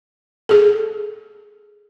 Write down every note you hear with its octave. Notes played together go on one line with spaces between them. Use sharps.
G#4 A4